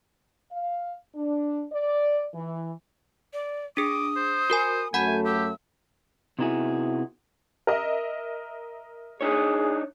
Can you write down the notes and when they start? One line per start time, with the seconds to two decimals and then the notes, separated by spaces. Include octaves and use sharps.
0.52 F5
1.15 D4
1.72 D5
2.34 E3
3.33 D5
3.77 D4 G#4 D6 D#6
4.16 C5
4.50 F#4 A#4 G#5
4.94 F#2 F#3 A3 F#5 G#5 B5 G6
5.25 G4 E6
6.39 C3 B3 D#4 E4 F#4 G#4
7.67 A#4 D#5 E5
9.21 D4 D#4 G#4 C#5